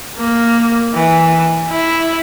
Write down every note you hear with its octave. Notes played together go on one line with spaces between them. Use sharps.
A#3
E3
E4